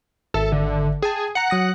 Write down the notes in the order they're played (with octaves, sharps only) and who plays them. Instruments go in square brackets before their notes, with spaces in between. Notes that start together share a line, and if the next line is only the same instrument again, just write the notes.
[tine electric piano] G#1 E5 [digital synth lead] A4
[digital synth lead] D3
[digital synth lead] G#4 [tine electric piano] G5 A5
[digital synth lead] F#5 [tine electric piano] A#5 C#7
[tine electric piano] F#3 D#6 A#6